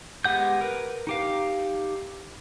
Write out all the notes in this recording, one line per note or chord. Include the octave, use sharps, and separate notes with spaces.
G#3 B3 G4 F#5 G6
A#4 B4
D#4 G4 F5